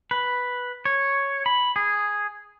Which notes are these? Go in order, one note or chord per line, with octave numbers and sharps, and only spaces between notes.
B4
C#5
B5
G#4